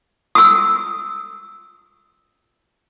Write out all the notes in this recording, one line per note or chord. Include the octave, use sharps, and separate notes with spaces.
D#6 E6